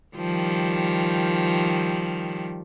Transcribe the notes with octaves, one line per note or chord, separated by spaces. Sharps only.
D#3 F3 G3